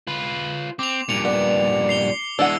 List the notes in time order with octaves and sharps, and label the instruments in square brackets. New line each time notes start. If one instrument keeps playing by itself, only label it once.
[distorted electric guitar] F4 B4
[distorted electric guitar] C4 [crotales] D6 F7
[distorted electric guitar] G2 A#2 [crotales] C#7 F7
[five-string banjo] B3 [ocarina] D5
[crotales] C7 F7 G7
[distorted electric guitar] E3 G#3 [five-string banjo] D4 F#5 [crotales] E6 G7